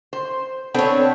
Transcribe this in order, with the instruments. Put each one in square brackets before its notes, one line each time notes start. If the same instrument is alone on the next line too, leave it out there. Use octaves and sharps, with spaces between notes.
[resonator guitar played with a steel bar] C5
[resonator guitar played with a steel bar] B3 D4 A4 [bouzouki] C4 C#5